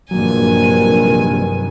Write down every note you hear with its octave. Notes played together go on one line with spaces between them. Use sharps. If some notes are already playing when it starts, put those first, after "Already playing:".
A#1 G2 C3 D#3 F#3 A#3 G#5